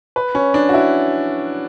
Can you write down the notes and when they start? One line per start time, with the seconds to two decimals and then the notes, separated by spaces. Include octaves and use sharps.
0.16 B4
0.35 C#4
0.54 D4
0.69 F#4
0.74 E4